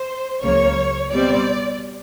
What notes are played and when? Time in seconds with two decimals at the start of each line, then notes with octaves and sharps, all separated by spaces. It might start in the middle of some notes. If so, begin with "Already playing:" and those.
Already playing: C5
0.42 C#2 C#3 F#3 A#3 C#5
1.11 B2 G3 C4 D5